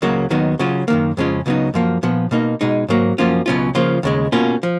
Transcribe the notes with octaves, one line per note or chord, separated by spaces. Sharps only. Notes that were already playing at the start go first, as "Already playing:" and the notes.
C#2 C#3 F#3 A#3
D#2 D#3 F#3 B3 D#4
C#3 F#3 C#4 F4
F#2 D#3 A#3
F2 C#3 G#3 C#4 F4
C#2 C#3 F#3 B3 D#4
F#2 F3 A#3
A#2 F3 B3
B2 A#3 D#4
B2 G#3 D#4
G#2 F#3 A#3
F#2 F3 A#3 C#4 F4
C#2 B2 F#3 C#4 F4
C#3 F3 A#3 F4
D#2 C#3 G#3
B2 A#3 C#4 F4
F3